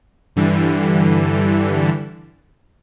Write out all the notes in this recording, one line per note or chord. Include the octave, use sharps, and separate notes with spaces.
G2 D3 E3 G3